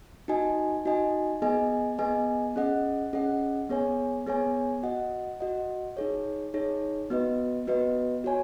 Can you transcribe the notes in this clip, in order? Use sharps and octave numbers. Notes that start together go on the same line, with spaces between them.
D#4 F#4 D#5 G#5
D#4 F#4 D#5 G#5
B3 G#4 D#5 G#5
B3 G#4 D#5 G#5
C#4 G#4 D#5 F#5
C#4 G#4 D#5 F#5
B3 G#4 C#5 G#5
B3 G#4 C#5 G#5
F#4 D#5 F#5
F#4 D#5 F#5
D#4 G#4 C#5
D#4 G#4 C#5
B3 F#4 B4 D#5
B3 F#4 B4 D#5
F#4 C#5 G#5